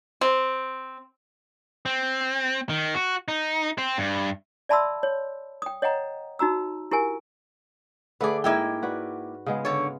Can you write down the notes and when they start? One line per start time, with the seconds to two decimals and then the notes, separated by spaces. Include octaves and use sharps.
0.21 C4
1.86 C4
2.69 D#3
2.95 F#4
3.28 D#4
3.78 C4
3.98 G2
4.69 D5 E5 A5 B5 C6 E6
5.03 C#5
5.62 G5 D#6
5.82 C#5 D#5 F#5 G5 A#5
6.39 D#4 F#4 A#5 E6
6.91 E4 G4 A#4 G#5
8.21 D3 A3 G#4 B4 D5
8.44 G#2 A#3 E4 D#5 G5
8.83 F#4 B4 D5
9.46 C#3 G#3 B3
9.65 D3 C#5